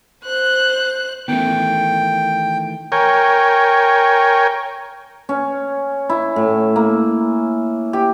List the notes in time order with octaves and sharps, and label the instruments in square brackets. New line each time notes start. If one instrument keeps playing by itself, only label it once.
[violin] C5 F#6
[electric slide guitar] D#3 E3 A3 [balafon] B3 C#4 [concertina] G5
[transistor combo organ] A#4 C#5 G5 G#5
[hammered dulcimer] C#4
E4
A2
A#3
G4